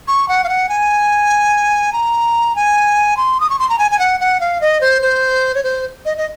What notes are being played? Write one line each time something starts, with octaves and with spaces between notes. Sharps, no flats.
C#6
F#5
F5
F#5
G#5
A#5
G#5
C6
D#6
C#6
C6
A#5
G#5
G#5
F#5
F#5
F5
D#5
C5
C5
C#5
C5
D#5
D#5